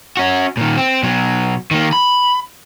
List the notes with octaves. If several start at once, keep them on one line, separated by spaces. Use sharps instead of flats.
C#4 F#4
A#2 D#3
C4
B2 F#3
D#3 A#3
B5